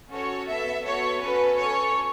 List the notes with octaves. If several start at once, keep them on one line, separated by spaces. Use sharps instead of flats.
C#4 F#4 A4 C#5
B3 A4 E5
B3 F#4 A4 C#5
C#4 F#4 A4 B4
C#4 A4 C#5